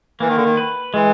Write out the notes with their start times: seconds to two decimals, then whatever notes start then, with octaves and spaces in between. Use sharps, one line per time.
0.20 E3 A#3
0.29 D#3
0.36 D3
0.44 D#3
0.57 B4
0.94 E3 G#3